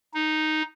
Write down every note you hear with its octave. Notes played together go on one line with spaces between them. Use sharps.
D#4